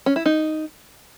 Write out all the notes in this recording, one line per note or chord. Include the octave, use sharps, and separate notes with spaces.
C#4
E4
D#4